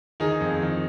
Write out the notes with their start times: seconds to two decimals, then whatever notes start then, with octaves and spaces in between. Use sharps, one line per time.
0.20 D#3 D#4 G#4
0.41 F2
0.62 D#3